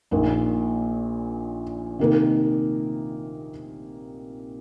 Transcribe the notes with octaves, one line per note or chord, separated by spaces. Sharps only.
A#1 A#2 A#3 D#4
C3 D#3 A#3 D#4 A#4